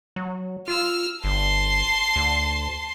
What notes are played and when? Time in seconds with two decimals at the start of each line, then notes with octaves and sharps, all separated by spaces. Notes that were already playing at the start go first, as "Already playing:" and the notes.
0.16 F#3
0.68 F4 E6 F6
1.24 G1 A5 C6
2.16 D2